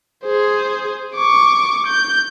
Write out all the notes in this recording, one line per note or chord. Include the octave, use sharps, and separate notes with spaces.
G#4 C5
C#6 D6
G6